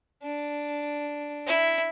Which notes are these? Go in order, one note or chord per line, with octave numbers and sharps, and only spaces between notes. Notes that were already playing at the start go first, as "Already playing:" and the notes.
D4
E4